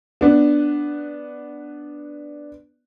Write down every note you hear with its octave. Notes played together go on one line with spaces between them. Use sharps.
B3 D4